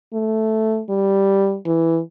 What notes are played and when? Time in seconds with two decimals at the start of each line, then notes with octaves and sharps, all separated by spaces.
0.14 A3
0.89 G3
1.66 E3